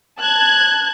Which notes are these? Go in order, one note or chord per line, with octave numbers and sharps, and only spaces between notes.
A5 F#6 G#6